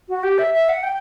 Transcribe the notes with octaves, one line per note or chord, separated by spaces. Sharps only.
F#4
G4
E5
E5
F#5
G5